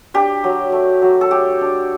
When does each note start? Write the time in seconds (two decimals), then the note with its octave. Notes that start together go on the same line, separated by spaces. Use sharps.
0.14 D4 G4
0.44 F#3
0.72 A3
1.02 F#3
1.21 A4
1.31 A3 G4
1.61 D4